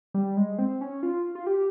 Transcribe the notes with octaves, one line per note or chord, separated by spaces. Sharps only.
G3
G#3
C4
C#4
F4
F4
G4